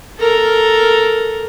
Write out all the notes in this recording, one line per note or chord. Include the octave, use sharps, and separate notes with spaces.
A4 A#4